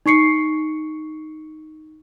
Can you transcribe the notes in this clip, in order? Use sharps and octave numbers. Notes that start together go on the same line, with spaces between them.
D#4 C#6 C7 C#7